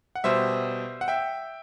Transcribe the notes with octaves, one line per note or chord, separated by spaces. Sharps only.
F#5
B2 G3 C5 E5
F#5
E5 G5